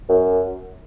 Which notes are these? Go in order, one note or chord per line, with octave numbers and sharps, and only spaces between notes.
F#2